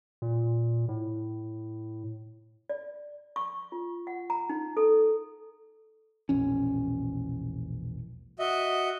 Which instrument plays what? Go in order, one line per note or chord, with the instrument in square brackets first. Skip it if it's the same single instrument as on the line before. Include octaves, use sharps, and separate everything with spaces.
[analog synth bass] A#2
A2
[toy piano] D5
C#6
F4
F#5
A#5
D#4
A4
[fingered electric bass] E1 A#1 C#4
[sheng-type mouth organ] F#4 D#5 E5